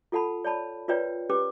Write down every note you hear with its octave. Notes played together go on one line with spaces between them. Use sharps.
F4 A4 F#5 A5 B5
C#5 D5 A5 B5
F4 A#4 B4 C#5 D5 G5
C#4 G4 B4 D6